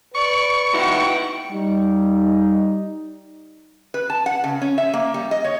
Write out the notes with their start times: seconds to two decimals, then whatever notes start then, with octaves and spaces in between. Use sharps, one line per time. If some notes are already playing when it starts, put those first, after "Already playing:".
0.15 B4 D5 C#6
0.74 D#4 E4 F#4 F#5 G5
1.51 G3 D#4
3.94 B4
4.10 A5
4.26 F#5
4.44 C#3
4.62 C#4
4.78 E5
4.94 A#3
5.14 G3
5.31 D#5
5.44 C#5